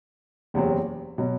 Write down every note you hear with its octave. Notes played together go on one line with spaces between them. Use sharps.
F#1 E2 C3 F#3 C4
B2 F#3